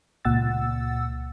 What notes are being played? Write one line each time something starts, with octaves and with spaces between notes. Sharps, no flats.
C#2 A#2 F#5 E6 A6